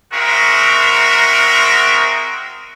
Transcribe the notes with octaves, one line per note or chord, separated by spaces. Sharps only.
G#3 C4 F#4 A#4 E5